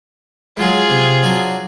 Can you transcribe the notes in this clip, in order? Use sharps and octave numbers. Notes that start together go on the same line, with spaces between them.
F#3 G#3 F4 G#4
C3
F#3 D4